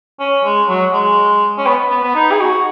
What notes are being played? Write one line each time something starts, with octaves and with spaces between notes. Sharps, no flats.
C#4
G#3
F#3
G#3
C#4
B3
B3
B3
D#4
G#4
F#4